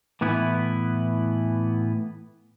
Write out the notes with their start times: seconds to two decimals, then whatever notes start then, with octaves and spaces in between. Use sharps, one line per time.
0.21 A2 E3 B3 E4